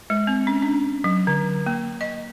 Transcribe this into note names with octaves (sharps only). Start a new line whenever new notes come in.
G#3
C4
C#4
D4
F#3
D3
A#3
D#5